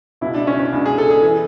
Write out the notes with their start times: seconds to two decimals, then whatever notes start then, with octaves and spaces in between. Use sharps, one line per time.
0.21 C#2 B2 E4
0.34 D4
0.47 C#4
0.54 D4
0.59 C#4
0.72 C#2 B2 D4
0.86 G#4
0.98 A4
1.11 G#4
1.22 E3